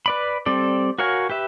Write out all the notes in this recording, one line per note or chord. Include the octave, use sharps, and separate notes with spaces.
B4 D5 B5
G3 C4 A4 D5
F#4 A#4 C#5 F5 G#5
G4 B4 E5